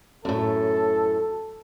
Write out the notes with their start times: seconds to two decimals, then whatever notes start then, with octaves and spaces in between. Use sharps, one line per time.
0.25 F#2 A2 A4